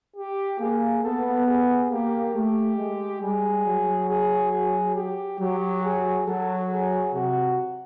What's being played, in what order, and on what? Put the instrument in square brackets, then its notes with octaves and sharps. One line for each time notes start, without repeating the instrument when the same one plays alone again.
[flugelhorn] G4
[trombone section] A#3 [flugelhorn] G#4
[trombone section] B3 [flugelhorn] A4
[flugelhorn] G#4
[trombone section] A#3 [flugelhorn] G4
[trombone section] A3 [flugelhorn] G4
[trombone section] G#3
[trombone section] G3 [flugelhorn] G#4
[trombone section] F#3
[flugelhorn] G#4
G#4
G4
[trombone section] F#3 [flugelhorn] G4
[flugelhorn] G#4
[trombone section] F#3 [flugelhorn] A4
[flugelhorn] G#4
[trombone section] C3 [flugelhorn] F#4